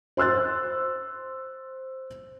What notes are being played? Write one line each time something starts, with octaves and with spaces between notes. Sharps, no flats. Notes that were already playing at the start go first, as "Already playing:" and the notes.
C5 C6 E6 F#6 A6